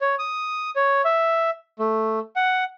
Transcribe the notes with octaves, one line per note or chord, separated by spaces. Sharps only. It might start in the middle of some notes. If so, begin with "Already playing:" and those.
C#5
D#6
C#5
E5
A3
F#5